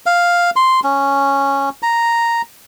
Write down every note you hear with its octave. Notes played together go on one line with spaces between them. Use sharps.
F5
C6
C#4
A#5